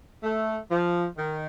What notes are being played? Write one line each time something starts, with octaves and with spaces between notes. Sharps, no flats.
A3
F3
D#3